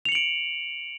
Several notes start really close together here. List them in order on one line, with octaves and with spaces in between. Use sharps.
F7 C#7 F#7 D7